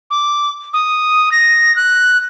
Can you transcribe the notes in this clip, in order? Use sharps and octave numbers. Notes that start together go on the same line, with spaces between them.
D6
D#6
A#6
F#6